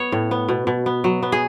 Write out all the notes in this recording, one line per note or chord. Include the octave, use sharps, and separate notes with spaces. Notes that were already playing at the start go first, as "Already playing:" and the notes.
Already playing: B3 C#5
A2
B3
B2
B2
B3
F#3
B3
G#4